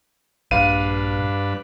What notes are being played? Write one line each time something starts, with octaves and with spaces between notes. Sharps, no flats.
A#1 G2 D4 B4 F5 D#7